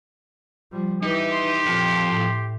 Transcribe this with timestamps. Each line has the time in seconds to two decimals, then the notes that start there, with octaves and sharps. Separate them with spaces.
0.72 F3 G3
1.03 E3 D#4 G4
1.32 C6
1.66 F2 A#2
2.06 A2